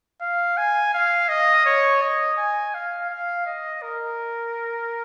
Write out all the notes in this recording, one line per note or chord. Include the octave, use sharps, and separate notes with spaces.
F5
G#5
F5
D#5
C#5
D#5
G#5
F5
F5
D#5
A#4